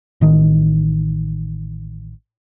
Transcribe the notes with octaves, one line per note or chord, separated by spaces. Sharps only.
A1 D#3